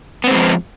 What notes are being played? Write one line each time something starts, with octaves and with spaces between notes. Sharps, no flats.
F3 G#3 B3 C4